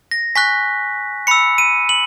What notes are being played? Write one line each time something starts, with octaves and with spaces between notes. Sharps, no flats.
A#6
G#5 C#6 F#6 B6
B5 E6 C#7
D#7
F#7